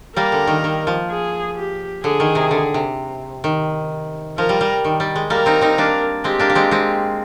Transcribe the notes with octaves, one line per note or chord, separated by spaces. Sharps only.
G3 A#3 A#4
D3
D#3
D#3
F3
G#4
G4
D3 G#4
D#3
C3
D3
C3
D#3
F3 A#4
G3
G3
D#3
G3
G#3
G3 A#3 A#4
C4 D#4
C4 D#4
A#3 D4
G#3 C4 G4
A#3 D4
A#3
G#3 C4
G#3 C4